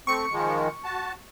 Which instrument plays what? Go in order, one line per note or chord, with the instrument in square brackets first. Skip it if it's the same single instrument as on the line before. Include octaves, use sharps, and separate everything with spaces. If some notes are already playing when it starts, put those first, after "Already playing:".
[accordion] A3 C4 [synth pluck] C#6 C#7
[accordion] D#3 F3 G#3
F#4 A5